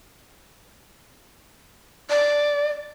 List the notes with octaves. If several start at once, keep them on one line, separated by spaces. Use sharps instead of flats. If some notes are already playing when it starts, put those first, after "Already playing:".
D5